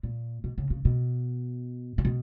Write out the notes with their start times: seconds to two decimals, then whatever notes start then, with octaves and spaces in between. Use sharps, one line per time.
0.03 A#2
0.44 B2
0.58 C#3
0.70 C#3
0.85 B2
1.98 C#3
2.05 B2